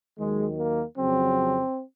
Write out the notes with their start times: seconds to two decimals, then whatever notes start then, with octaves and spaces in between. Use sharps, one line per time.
0.18 D#2 D#3 F#3 G#3
0.58 A#3
0.98 F2 C#3 F#3 C4